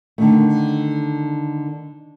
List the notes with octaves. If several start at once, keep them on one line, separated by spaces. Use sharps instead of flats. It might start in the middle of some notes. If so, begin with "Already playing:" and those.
D3 D#3 A3